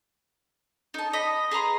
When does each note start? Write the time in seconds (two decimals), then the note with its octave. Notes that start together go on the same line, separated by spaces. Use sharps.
0.94 D#4 A5
1.13 D#5 B5
1.51 G#4 B4 A#5 C6